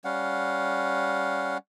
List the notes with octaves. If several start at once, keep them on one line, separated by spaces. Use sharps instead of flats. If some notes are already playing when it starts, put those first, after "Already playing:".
G3 C#4 F5 F#5